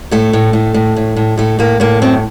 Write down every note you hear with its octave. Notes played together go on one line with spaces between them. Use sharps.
A2 A3
A2
A2
A2
A2
A2
A2 A3
A2 A#3
A2 A#3
F#2 C4